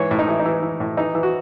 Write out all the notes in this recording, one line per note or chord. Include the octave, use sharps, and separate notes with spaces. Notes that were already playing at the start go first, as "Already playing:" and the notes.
Already playing: G#2 E3 C#5
A2
D#4
E3 E4
D#4
E3
E3
A2
E3 D#4
E3
F#4